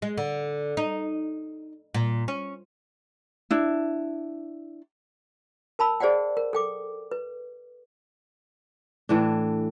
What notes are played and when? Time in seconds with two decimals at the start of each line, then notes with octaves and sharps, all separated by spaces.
0.02 G#3
0.18 D3
0.77 D#4
1.94 A#2
2.28 C#4
3.51 D4 E4
5.79 A#4 A5 B5 E6
6.00 G#4 C5 D5 F#5 G5
6.37 A#4
6.53 A4 G5 D6
7.11 B4
9.09 A2 E3 D4